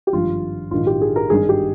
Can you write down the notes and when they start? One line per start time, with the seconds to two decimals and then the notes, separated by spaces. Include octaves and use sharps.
0.07 G4
0.13 G#1 G2 F3 F4
0.71 A#1 G#2 D#3 F4
0.87 G4
1.01 G#4
1.16 A#4
1.30 G#1 G2 D#3 G#4
1.49 G4